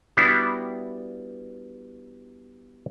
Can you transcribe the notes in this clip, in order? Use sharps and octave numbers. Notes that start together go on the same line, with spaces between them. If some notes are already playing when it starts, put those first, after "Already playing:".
G3 B3 D4 E4 F#4